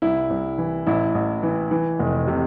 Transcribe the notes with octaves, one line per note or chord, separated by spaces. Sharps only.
C2 E4
C2
E3
A1 E4
A1
E3
E3
F1
C3